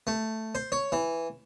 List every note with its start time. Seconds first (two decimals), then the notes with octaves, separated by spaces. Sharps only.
0.07 A3
0.55 C5
0.72 C#5
0.92 E3